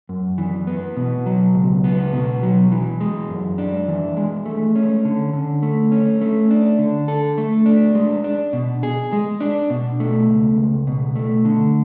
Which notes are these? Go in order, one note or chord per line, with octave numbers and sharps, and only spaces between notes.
F#2
E3
B3
B2
F#3
C#2
B3
B2
F#3
E3
G#3
F#2
D4
E3
G#3
A3
C#4
D3
D3
A3
C#4
A3
D4
D3
A4
A3
D4
G#3
D4
B2
G#4
G#3
D4
B2
A3
C#2
C#2
B2
A3
D3